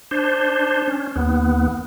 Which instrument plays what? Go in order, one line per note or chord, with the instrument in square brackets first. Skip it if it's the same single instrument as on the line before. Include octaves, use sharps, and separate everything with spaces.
[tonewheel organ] D4 C5
C#4
D#2 B3